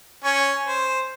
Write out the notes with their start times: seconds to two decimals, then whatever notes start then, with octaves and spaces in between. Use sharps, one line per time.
0.24 C#4 C#5
0.67 C5